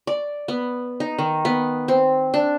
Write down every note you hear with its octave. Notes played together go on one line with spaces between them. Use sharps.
D5
B3
D#4
D#3
B3
C4
D4